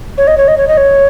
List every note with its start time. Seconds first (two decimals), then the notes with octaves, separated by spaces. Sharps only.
0.18 C#5
0.27 D#5
0.37 C#5
0.48 D#5
0.57 C#5
0.68 D#5
0.77 C#5